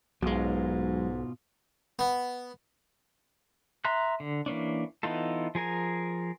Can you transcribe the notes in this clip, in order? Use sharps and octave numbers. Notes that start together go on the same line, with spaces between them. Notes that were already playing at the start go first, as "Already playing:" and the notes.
B1 G#2 B2 F#3 G#3 F4
B3
E5 A#5 C6 F#6
D3
E3 A#3 C#4 D4
E3 B3 D#4 F4 A4
F3 G#4 A#4 G#5